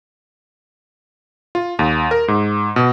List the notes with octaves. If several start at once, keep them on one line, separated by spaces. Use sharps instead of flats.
F4
D#2
A#4
G#2
B2